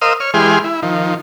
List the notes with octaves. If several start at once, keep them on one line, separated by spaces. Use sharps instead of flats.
A#4 C5 D#5 F5 D#6 E6
C#5 F6
E3 G#3 G4 G#4 C6 F6
E4
D#3 F3